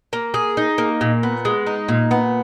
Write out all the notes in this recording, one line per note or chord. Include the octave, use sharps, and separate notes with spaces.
A#3
G#4
D#4
A#3
A#2
B3
G#3
D#4
A#2
B3